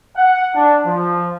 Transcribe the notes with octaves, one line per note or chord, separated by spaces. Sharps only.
F#5
D4
F3